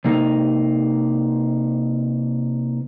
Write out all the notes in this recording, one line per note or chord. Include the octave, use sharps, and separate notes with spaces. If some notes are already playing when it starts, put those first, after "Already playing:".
C3 A#3 D#4